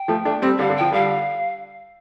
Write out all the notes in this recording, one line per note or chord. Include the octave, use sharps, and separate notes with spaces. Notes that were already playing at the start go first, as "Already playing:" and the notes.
Already playing: G5
F3 A3
A3 D4
G3 C4
D3 G3 F5
D3
F3 G5
D3 G3 F5